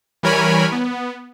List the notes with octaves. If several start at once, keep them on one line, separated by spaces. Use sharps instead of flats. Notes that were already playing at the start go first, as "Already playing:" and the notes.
E3 G3 A#4 C#5 G#5 B5
B3